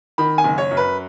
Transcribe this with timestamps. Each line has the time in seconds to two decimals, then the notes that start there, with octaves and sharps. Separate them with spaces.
0.18 D#3 B5
0.38 G#5
0.44 F#1
0.58 C#5
0.71 F#2
0.77 B4